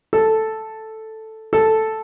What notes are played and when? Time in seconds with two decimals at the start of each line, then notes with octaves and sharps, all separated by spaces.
0.13 A4
1.53 A4